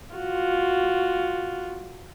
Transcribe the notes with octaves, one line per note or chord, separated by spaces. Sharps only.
F4 F#4